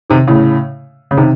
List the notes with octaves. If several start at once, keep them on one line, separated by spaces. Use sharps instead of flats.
C3 D#3
A2 C#3
C#3
C3 D#3